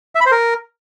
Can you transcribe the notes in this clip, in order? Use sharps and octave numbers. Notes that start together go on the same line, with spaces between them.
E5
B5
C5
A#4